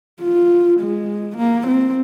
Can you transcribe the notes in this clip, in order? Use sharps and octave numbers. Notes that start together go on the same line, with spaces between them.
F4
G#3
A#3
C4